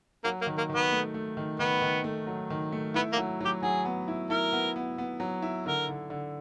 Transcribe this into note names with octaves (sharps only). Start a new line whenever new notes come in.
F#3 A#3
A#3
D#3
A#3
D#3
B3
A3
A3
D#3
D#3 B3
D#3
A3
F#3
D#3
A3
B3 E4
A#3
F#3
F#3 G4
F#3 G#4
B3
E4
E4 A#4
B3
B3
B3
F#3
E4
D3 A#4
D3
D3